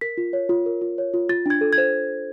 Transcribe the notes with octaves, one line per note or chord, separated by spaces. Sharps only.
A#4 B6
F4
C#5
F4
A#4
F4
C#5
F4
F4 A6
D4 G#6
A4
G#6
C5